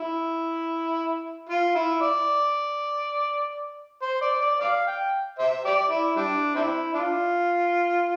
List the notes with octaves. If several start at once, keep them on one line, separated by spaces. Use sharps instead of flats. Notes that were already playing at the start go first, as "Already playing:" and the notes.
Already playing: E4
F4
E4
D5
C5
D5
D5
D5 F5
G5
C5 E5
G4 D5
E4
G3 D4
C4 E4
D4 F4